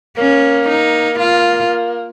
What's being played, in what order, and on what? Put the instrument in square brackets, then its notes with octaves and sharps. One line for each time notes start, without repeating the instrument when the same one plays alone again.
[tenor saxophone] A#3 [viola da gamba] C#4
[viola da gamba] D#4
F4